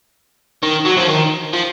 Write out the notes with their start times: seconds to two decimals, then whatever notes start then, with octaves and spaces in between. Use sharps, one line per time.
0.63 D#3
0.85 F#3
0.97 F3
1.08 D#3
1.53 F3